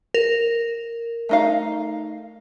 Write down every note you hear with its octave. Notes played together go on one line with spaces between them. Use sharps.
A#4
A3 D#4 F5